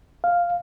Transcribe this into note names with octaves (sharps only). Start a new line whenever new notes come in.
F5